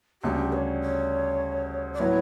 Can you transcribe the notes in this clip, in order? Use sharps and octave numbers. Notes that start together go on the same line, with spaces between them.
D2 C#3 G3 D4 G4
C#5
C#5
D5
A2 F#3 B3 E4 C#5